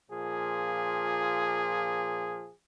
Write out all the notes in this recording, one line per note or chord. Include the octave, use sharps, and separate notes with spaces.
A#2 F3 G#4